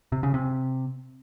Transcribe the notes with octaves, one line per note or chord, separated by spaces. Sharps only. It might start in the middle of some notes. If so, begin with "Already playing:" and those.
C3
C#3
C3